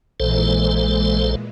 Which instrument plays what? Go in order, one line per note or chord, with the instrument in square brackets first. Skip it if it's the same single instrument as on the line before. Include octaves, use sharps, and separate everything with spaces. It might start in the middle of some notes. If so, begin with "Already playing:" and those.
[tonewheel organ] A#1 A4 C5 [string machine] A#2 E3 G#3